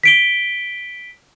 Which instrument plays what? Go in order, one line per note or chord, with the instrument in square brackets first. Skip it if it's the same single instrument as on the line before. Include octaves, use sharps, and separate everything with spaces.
[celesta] B6 D7 G7